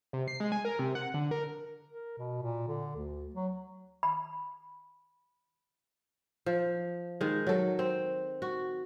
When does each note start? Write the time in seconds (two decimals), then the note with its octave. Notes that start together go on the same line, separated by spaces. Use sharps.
0.13 C3
0.28 C7
0.40 G#3
0.52 G#5
0.65 A#4
0.79 C3
0.95 F#5
1.14 D3
1.31 A#4
1.90 A#4
2.18 B2
2.42 A#2
2.68 D3
2.96 D2
3.34 F#3
4.03 B5
6.46 F3
7.21 D#3 G#3
7.47 F#3 A4
7.79 C4
8.42 F#4